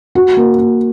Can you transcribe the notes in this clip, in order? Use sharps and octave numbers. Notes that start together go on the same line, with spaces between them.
F#4
A#3
A#3